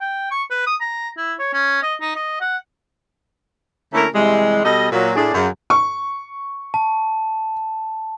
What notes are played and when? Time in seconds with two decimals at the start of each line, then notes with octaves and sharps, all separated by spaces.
0.01 G5
0.31 C#6
0.50 B4
0.66 D#6
0.81 A#5
1.17 E4
1.39 C#5
1.53 C#4
1.83 D#5
2.01 D#4
2.16 D#5
2.41 F#5
3.94 D3 A3 A#3 C#4 E4 A#4
4.14 C3 E3 G3 G#3
4.65 B2 G3 A4 D#5
4.92 A#2 F#3
5.16 A2 D4 G#4
5.34 F#2 C#3
5.70 C#6
6.74 A5